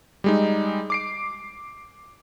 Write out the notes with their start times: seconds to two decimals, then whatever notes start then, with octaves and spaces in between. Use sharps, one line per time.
0.24 G3 G#3 D#4
0.90 D6 C7 D7